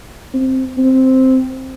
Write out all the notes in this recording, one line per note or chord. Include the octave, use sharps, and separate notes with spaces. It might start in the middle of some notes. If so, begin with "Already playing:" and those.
C4
C4